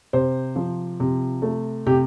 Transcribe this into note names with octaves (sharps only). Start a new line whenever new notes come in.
C3 C5
F3
C3
A3
C3 G4